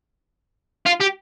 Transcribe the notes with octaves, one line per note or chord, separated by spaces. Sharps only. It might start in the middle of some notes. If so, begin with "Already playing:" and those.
F4
G4